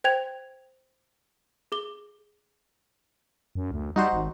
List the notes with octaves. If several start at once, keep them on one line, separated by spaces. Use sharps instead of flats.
C5 G5 G#6 F7
G#4 D6 G7
F#2
D2
G3 D#4 F#4 C5
G#1